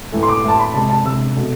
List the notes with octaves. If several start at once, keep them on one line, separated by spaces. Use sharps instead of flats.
A2 E3 A3
C6
D6
A2 E3 A3 A5
B5
C3 G#3 A5
A5
C3 G#3 E6
B2 A3